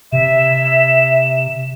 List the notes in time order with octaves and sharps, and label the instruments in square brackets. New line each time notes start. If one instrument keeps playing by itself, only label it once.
[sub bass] C3 [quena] E5 [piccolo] E7